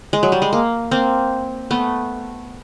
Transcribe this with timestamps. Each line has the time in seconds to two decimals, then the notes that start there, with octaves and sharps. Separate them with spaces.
0.13 G#3
0.23 F#3
0.32 G3
0.42 G#3
0.53 A#3
0.91 A#3 C4
1.71 A3 B3